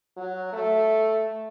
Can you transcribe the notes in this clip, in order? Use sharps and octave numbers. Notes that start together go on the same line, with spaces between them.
F#3
A3